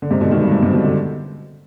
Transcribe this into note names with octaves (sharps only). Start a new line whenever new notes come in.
D3
G#2 C3
B2 D3
C3 D#3
G2
G#2
G#2 C3
B2 D3
B2 D3